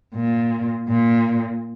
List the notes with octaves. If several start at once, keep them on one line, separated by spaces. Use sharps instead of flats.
A#2
A#2